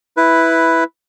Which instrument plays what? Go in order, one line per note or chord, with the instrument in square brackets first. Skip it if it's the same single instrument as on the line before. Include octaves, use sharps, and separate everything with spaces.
[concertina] E4 B4